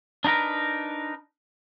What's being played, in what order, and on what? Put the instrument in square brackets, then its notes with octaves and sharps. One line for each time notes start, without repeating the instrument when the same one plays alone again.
[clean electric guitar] D4 D#4 F#4 A#4 B4